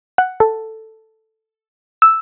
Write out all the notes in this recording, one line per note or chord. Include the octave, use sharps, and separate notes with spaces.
F#5
A4
E6